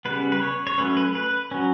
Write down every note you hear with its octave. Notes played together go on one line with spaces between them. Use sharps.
C#3 G3 B3 B4
B4
C#5
C#5
F#3 A3 C#4 B4
B4
B4
F#3 C#4